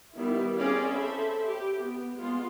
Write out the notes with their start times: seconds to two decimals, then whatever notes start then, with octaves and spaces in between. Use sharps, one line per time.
0.17 D#3 G3 B3 E4
0.56 C4 C#4 G#4 C#5 D5 F5
0.89 A4 C5 E5 B5
1.45 G4
1.77 B3
2.17 G#3 B3 F4